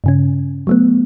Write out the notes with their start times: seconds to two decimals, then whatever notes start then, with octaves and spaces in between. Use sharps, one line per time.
0.04 G2 C#3 C#4
0.67 F#3 A3 B3